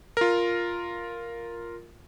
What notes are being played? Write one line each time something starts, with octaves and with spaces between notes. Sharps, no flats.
F4 A#4